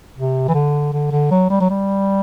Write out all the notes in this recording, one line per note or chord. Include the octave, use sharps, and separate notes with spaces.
C3
E3
D3
D3
D3
F#3
G3
F#3
G3